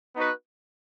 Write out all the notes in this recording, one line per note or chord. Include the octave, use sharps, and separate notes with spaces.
B3 D#4 F#4 B4